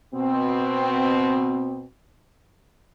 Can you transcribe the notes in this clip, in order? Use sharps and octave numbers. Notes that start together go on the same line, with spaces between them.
B2 C4